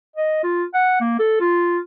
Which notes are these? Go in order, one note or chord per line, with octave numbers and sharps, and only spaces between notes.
D#5
F4
F#5
A#3
A4
F4